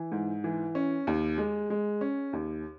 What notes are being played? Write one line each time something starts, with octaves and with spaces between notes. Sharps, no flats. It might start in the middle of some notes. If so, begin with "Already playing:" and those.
Already playing: E3
G#2
E3
C#4
D#2
G#3
G#3
C#4
D#2